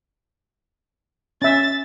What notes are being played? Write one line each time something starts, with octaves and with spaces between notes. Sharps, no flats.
C#4 E5 A6